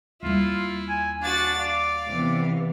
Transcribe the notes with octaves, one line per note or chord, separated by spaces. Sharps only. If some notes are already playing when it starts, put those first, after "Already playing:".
D#2 G3 E4 F4
G#5
D4 F#4 A6
D5 F5
C3 E3 B3